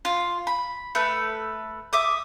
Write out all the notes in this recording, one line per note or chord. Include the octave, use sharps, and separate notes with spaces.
F4
B5
A3 B4
E5 D6 D#6